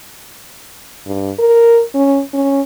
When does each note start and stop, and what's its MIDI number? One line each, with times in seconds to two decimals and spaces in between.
1.06 1.31 43
1.39 1.82 70
1.94 2.21 61
2.33 2.61 61